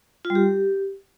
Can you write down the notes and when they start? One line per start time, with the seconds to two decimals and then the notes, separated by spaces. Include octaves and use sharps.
0.25 F4
0.30 G3
0.35 G4